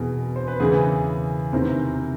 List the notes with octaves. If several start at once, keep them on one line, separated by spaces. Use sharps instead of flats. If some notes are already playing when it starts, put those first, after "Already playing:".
Already playing: E2 B2 G#4 A#4
C5
B4
E2 C#3 E3 G#4 A#4
E2 C3 D#3 A#4 C5